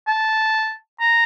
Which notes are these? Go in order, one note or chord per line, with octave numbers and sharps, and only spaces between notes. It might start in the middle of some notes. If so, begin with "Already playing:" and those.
A5
A#5